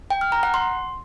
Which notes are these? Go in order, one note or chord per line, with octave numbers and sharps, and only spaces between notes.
G5
F6
A#5
F#5
C6